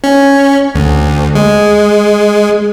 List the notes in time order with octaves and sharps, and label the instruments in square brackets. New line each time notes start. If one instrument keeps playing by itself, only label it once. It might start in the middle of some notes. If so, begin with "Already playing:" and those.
[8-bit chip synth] C#4
D2
G#3